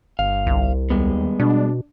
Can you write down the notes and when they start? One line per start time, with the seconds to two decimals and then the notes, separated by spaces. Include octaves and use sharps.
0.19 G1 F5
0.47 C2
0.90 D#2 G3 G#3 B3
1.40 B2 D4